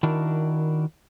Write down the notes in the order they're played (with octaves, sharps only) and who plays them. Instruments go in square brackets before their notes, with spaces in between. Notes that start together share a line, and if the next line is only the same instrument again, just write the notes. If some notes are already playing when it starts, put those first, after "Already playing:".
[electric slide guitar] D#3 D4 E4 F#4 A#4